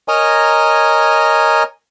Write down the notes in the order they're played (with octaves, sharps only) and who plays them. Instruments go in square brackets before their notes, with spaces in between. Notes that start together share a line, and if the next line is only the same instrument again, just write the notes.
[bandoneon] A#4 C#5 D#5 G#5 A#5